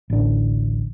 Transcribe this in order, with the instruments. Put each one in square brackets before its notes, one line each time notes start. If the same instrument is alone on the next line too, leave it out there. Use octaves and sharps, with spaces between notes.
[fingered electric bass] A1 D2 D4